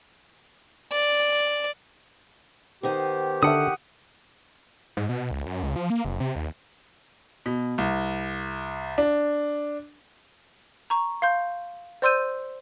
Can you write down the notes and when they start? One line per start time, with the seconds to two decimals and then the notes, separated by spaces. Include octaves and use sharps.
0.92 D5
2.83 D#3 B3 D#4 G4 C5
3.43 D3 A4 E5 F#5 D#6
4.97 G#2
5.09 B2
5.31 C#2
5.46 F#2
5.63 C#2
5.76 F3
5.90 A#3
6.05 F#1
6.20 C3
6.35 D#2
7.46 B2
7.78 C2
8.98 D4
10.90 A#5 C#6
11.22 F5 C6 G6
12.02 C5 D5 C6 E6 G6 D#7